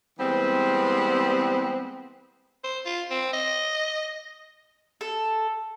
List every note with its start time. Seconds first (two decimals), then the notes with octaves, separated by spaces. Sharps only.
0.19 E3 G3 G#3 B3 C4
2.64 C5
2.86 F4
3.11 C4
3.33 D#5
5.01 A4